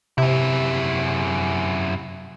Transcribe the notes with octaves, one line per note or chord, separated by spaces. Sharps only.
F#2 C3 E4